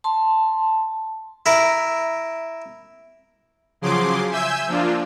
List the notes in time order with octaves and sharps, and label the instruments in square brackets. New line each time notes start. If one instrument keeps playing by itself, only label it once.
[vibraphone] A5 C6
[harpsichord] E4 A#4
[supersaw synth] C#3 F3 F#3 G#4 C6 D6
E5 G#5 E6 G6
F3 A#3 D4 F4